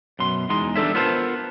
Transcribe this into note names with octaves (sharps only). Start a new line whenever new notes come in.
F#2 B2 C6
E2 G#3 D#4 C6
G3 D4 A4 C#5 E5
B3 F4 A#4 C5 A5